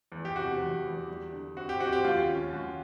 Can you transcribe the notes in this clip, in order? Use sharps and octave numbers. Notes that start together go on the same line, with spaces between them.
E2
G4
C3 F#4
E2
E2
G3
D3
C4 F#4
G4
C4 F#4
G4
D#2 F4
C#4
D#2 F#4